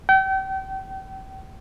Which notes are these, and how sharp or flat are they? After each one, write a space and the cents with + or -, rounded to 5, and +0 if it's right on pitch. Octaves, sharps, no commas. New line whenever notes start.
G5 -35